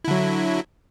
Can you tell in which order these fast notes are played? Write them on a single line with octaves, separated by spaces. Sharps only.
E4 D3 F#3